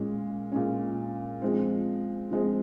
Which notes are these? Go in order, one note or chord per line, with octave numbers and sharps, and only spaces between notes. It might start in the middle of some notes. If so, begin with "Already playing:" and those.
Already playing: A#2 G#3 C#4
A#2 G#3 C#4
F3 G#3 C4
F3 G#3 C4